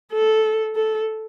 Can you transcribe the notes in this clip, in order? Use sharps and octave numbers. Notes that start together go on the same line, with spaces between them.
A4
A4